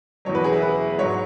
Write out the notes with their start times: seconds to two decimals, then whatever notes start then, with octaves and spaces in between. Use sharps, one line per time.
0.25 E2 B2 F#3 C#5
0.35 B4
0.44 G#4
0.53 E4
0.62 B4
0.98 G#2 F#3 C#5